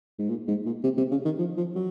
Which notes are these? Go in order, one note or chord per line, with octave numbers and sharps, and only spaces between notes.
G#2
A#2
G#2
A#2
C3
C3
C#3
D#3
F3
F3
F#3